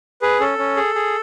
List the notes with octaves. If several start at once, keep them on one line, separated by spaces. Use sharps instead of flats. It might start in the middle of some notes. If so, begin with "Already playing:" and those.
G#4 B4
C#4 A4
C#4
G#4
G#4